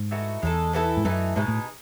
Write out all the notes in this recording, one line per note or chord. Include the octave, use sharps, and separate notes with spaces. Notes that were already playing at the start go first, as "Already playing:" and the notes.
Already playing: G#2
E3 A3 D#4 F#4
E2 G#3 D#4 A4
E3 B3 E4 A4
G#2
F#2 E3 A3 D#4
G#2 B2 G#3 D#4
A2